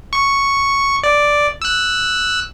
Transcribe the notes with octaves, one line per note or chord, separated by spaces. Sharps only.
C#6
D5
E6 F#6